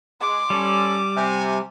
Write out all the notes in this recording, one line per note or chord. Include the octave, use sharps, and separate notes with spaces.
G#3 C6 D6
G3 C#4 A4
C3 G#5